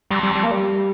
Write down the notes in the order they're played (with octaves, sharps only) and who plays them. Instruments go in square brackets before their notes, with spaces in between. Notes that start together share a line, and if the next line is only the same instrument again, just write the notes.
[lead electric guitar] F2 [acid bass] G3
[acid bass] G3
G3
A#3
G3